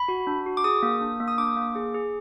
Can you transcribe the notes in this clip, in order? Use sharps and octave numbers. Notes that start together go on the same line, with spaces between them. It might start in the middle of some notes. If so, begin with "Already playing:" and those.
Already playing: B5
F#4
D4
F#4
D6
G#4 D#6
A#3
D4
A#3
D#6
D4 D6
A#3
G#4
G#4